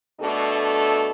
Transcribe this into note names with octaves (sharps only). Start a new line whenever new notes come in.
B2 A3 D4 A4